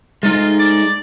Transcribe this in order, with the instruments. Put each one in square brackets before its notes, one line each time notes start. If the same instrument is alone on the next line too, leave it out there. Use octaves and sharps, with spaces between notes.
[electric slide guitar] G#3 A3 D#4 [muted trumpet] F4
[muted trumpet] D5